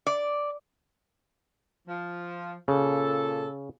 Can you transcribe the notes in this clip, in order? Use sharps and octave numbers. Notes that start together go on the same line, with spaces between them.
D5
F3
A#2 C#3 A4